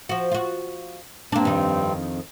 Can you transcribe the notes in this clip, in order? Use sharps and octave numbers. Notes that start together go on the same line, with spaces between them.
F3 F#4
F4 F#4
G2 A#3 C4 D4
F2 D#3